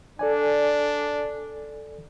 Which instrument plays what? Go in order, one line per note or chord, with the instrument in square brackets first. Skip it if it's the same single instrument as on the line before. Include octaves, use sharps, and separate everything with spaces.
[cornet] D4 [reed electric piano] A4 D5 G#5